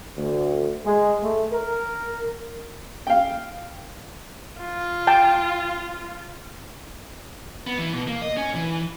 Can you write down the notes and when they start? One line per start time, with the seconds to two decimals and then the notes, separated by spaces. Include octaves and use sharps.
0.16 D2
0.84 G#3
1.21 A3
1.52 A#4
3.07 F5 G5
4.60 F4
5.07 G5 A5
7.67 B3
7.78 E3
7.93 B2
8.08 A#3
8.22 D#5
8.37 C#4
8.55 E3